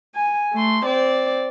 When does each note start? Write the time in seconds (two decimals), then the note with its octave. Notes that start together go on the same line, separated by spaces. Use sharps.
0.15 G#5
0.53 A3 C6
0.85 C4 D5